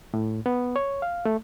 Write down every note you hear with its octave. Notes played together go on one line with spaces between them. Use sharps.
A2
B3
C#5
F5
A3